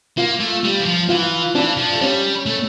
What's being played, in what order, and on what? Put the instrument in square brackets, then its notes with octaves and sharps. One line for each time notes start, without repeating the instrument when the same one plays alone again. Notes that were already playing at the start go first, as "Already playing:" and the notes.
[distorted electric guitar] A#3 [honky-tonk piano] F4
[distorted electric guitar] A3
G3
E3
F3
[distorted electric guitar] E3 [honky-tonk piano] F4
[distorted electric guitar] E3 [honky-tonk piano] D4
[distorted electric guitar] F3
A3
[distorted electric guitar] G3 [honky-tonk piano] C#4
[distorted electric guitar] A3